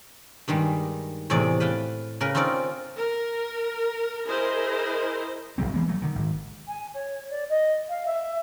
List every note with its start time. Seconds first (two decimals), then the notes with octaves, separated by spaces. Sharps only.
0.48 G2 D#3 G3 G#3
1.30 E2 A2 C3 G#4 D5
1.60 B4 F5 G5 A5
2.21 C#3 A#4 B4
2.35 C4 C#4 D#4 F4 D5
2.97 A#4
4.26 E4 G#4 A#4 C5 D#5
5.58 F1 F2 F#3 C4
5.74 E3 G#3 A#3 B3
5.87 F#3 A3
6.02 D3 D#3
6.15 G#1
6.67 G#5
6.94 C#5
7.30 D5
7.49 D#5
7.88 F5
8.06 E5